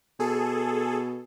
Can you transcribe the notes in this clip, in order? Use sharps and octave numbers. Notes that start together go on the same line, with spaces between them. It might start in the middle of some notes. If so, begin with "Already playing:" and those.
B2 G#4 A4